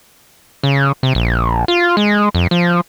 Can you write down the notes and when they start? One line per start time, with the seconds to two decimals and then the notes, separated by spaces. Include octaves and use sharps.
0.63 C#3
1.03 C3
1.15 A#1
1.68 F4
1.97 G#3
2.35 F2
2.51 F3